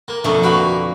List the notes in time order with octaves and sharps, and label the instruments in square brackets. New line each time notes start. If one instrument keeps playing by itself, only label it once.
[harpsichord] A#3
[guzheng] F2 B2 D3 [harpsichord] A3
[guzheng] A#3 [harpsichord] F#4 B4